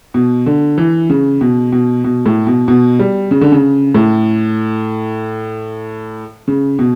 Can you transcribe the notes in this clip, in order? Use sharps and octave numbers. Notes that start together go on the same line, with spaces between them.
B2
D3
E3
C#3
B2
B2
B2
A2
B2
B2
G3
C#3
D3
C#3
A2
C#3
B2